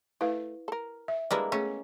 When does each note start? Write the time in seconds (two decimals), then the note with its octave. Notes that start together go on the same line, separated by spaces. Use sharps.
0.21 A3 E4 B4 F5
0.68 A4 A#4
1.08 E5
1.31 G3 G#3 A#3 D4 E4 B4
1.52 A3 B3 C#4 G#4